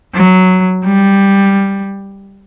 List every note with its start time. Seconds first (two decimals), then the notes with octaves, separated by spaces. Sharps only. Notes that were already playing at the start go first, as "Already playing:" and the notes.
0.14 F#3
0.85 G3